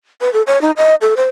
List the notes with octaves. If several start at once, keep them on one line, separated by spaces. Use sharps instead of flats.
B4
A4
C#5
D#4
D#5
A4
C5